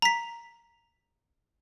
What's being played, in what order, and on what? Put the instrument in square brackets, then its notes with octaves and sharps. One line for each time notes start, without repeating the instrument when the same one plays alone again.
[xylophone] A#5 B6